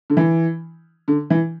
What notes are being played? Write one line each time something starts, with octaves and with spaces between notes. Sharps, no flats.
D3
E3
D3
E3